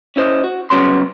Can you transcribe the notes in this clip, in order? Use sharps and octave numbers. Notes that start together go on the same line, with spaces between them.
C#4 E4 C5 D#5
F#4
C2 C#3 F#3 B3 C#4 C6